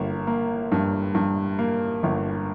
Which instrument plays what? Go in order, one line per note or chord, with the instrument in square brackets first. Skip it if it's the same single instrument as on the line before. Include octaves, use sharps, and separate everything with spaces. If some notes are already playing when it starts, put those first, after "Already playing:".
Already playing: [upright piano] G1 A#3
A#3
G2
G2
A#3
G1